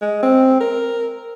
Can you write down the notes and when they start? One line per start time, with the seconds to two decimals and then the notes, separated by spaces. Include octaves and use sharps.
0.02 G#3
0.23 C4
0.60 A#4